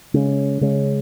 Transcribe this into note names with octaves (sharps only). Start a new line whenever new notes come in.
C#3 G#3 C#4
C#3 G#3 C#4